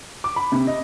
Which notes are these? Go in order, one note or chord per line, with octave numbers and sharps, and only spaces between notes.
D6
B5
C3
D#5